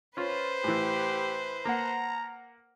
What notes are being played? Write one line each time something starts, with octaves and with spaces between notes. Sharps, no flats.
C#4 F4 B4 C5
A2 E3 G4
A#3 F#5 A#5